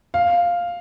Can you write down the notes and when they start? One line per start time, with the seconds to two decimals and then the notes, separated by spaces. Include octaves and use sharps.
0.14 F5